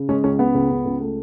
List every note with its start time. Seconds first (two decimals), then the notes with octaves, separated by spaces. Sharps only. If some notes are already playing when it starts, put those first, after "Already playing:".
Already playing: C#3
0.09 G#3 C#4
0.24 C#2 C#4
0.39 C#3 B3
0.54 C#2
0.70 C#2
0.85 C#2
1.01 A3